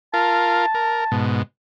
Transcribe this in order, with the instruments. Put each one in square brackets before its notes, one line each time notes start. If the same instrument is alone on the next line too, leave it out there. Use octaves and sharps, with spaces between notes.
[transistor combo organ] F4 A#4 [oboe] A5
[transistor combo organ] A#4
G#2 B2